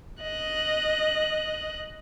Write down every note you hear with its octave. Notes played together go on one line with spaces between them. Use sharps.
D#5 F#6